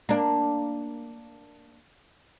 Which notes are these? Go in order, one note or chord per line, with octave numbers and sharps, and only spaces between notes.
A#3 D4